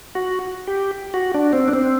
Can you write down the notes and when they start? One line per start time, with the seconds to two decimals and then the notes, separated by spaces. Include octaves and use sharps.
0.15 F#4
0.67 G4
1.14 F#4
1.34 D4
1.53 C4
1.68 D4
1.73 C4